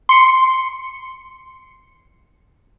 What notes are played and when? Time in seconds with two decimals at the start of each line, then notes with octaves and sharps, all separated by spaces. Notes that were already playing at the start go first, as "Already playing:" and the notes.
0.09 C6 C#7